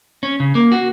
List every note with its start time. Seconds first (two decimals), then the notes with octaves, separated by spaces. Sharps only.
0.23 C#4
0.40 C#3
0.55 A#3
0.72 F#4